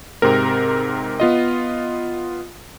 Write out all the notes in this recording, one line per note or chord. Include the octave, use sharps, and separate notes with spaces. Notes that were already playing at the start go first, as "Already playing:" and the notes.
G#2 C3 C4 A#4
B3 F4 D#5